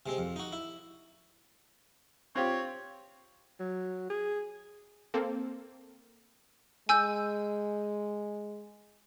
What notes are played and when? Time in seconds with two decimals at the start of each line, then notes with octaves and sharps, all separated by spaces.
0.06 C3 G#3 C4
0.18 F2
0.36 D#4 F#4
0.52 E4
2.35 C4 F4 G4 C#5
3.60 F#3
4.10 G#4
5.14 A#3 C4 A4
6.89 G#3 G#5 E6 G6